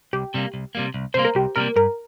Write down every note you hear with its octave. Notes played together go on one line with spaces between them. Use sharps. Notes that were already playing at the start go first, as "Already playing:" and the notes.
C2 G4
C3 G3 A#3
C2
C3 G3 A#3
C2
C3 G3 A#3 C5
A#4
C2 G4
C3 G3 A#3 A#4
G2 A#4